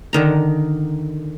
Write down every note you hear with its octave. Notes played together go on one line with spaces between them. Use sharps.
D3 D#3 A#5